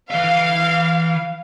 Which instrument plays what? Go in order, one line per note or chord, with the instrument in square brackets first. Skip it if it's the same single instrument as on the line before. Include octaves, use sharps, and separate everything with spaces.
[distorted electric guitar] E3 E5 [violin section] F5